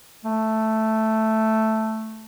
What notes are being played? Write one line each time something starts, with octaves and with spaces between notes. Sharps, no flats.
A3